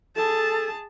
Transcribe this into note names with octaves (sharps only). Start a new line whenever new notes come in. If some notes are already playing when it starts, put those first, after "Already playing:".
G#4 A4 A5